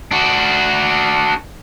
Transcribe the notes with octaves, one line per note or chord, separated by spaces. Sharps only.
D4 F#4